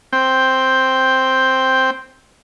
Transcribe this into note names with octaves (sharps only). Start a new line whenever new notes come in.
C4 G5